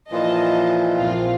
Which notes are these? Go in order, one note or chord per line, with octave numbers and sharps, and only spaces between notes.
A#2 E3 F3 D#5 A5
A#1 C4 F4